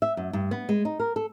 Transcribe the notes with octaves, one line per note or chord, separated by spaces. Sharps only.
E5
F#2
G2
B3
G#3
D#4
A#4
A4